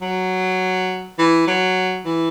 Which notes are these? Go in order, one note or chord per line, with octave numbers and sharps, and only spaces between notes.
F#3
E3
F#3
E3